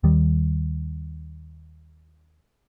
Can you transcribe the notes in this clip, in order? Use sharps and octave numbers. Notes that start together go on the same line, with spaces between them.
D#2 D#3 G3